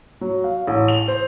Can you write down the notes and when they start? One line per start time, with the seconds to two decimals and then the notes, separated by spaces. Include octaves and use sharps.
0.21 F#3
0.44 F5
0.67 A1
0.88 F7
1.08 C5